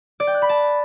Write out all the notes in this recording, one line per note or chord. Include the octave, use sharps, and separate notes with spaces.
D5
G5
F#6
B5
A5